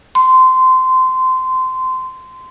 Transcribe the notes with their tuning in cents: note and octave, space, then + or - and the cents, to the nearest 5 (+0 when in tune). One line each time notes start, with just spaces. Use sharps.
C6 -20